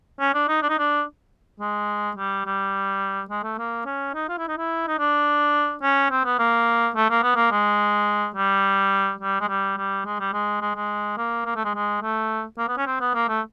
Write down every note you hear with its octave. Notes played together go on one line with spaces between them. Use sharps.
C#4
D4
D#4
D4
D#4
D4
G#3
G3
G3
G#3
A3
A#3
C#4
D#4
F4
E4
D#4
E4
D#4
D4
C#4
C4
B3
A#3
A3
A#3
B3
A#3
G#3
G3
G3
G#3
G3
G3
G#3
G3
G#3
G#3
G#3
A#3
A#3
A3
G#3
G#3
A3
A#3
B3
C#4
C4
B3
A#3
A3